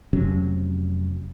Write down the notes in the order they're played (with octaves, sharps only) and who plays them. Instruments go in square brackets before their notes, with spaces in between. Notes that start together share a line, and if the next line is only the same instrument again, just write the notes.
[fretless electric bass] F1 C3 F#3 C#4